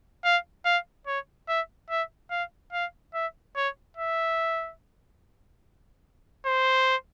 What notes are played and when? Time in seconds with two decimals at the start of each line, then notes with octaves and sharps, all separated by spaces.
0.24 F5
0.65 F5
1.07 C#5
1.48 E5
1.90 E5
2.31 F5
2.72 F5
3.14 E5
3.56 C#5
3.97 E5
6.46 C5